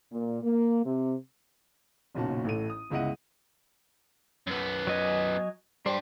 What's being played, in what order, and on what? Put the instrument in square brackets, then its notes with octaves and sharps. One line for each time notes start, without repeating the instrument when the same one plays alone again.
[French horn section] A#2
A#3
C3
[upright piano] F#1 B1 A#2 C#4 F#4 A5
A1 A2 A4 D#7
D#6
G1 C#2 E4 D#5 F#5 D#7
[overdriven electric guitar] F#2 B3
[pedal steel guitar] F#3 D#5 G#5
[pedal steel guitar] G3 C5 [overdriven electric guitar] D4 G4